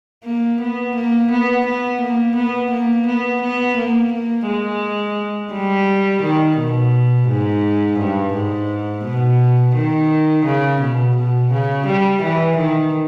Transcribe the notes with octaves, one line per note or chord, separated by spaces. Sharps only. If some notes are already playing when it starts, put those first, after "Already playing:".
A#3
B3
A#3
B3
B3
A#3
B3
A#3
B3
B3
A#3
A#3
G#3
G3
D#3
B2
G#2
G2
G#2
B2
D#3
C#3
B2
B2
C#3
G3
E3
D#3